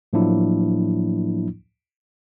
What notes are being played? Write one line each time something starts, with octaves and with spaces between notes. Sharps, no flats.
A2 F3 F#3 A#3 D4 E4